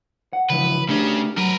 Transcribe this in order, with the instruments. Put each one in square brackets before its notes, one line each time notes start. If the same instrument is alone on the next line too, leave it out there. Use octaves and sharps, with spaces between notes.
[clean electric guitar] F#5
[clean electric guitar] C#3 E3 F3 [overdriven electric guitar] B4
[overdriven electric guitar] C#3 C#4 [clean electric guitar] A3 D4 G4
[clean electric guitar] F#3 [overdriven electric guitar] A#4 B4